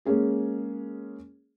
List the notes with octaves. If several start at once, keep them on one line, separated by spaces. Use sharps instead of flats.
G#3 A#3 C#4 G#4